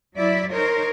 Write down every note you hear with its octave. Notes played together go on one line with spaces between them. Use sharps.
F#3 E4 D5 E5
D#4 A#4 C5 C#5